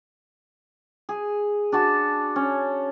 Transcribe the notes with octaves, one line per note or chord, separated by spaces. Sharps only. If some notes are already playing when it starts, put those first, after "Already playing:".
G#4
D4 F#4 A5
C#4